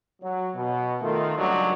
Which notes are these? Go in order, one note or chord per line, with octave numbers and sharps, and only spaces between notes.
F#3
B2
D#3 A3 F4
C#2 F#3 G3 D4 D#4 F#4